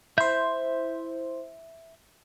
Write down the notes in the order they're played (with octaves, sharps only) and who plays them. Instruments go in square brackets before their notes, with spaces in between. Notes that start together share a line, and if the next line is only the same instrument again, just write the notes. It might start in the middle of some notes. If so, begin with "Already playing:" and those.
[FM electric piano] E4 C5 [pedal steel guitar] E5 G6